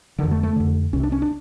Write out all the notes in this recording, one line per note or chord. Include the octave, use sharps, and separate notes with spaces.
F2 D3 D#3
A3
A3
F2 D3
C2 C3 C#4
D4
C#4
D4